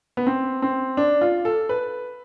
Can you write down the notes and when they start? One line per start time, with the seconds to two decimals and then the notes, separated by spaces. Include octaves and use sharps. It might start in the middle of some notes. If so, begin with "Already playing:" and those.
0.17 B3
0.27 C4
0.62 C4
0.97 D4
1.21 F4
1.45 A4
1.69 B4